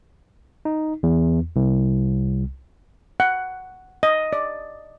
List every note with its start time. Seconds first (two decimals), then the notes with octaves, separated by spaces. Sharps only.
0.65 D#4
1.03 E2
1.56 C2
3.20 F#5
4.03 D#5
4.33 D5